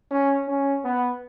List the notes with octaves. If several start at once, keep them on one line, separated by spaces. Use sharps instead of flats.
C#4
C#4
B3